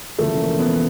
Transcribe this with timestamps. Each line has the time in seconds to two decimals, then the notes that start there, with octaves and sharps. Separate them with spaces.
0.19 E1 E2 C#3 F3 A3
0.39 A#3
0.59 B3